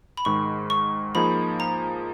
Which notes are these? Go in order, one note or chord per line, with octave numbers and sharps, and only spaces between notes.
B5
G#2 D#3 G#3 C#6
C#6
F3 A#3 D#4 G#4 B5
A#5